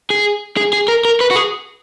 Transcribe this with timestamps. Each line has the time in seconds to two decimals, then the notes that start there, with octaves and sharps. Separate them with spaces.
0.10 G#4
0.57 G#4
0.73 G#4
0.88 A#4
1.05 A#4
1.21 B4
1.31 F#4
1.36 G#4